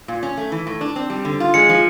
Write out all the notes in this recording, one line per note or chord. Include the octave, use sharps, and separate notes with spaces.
A#2
C#4
A3
E3
A2
D4
C4
G3
D3
F4
G#3 C#7
F3